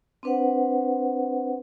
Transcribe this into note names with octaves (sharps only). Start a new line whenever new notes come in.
C4 D4 B4 C5 F#5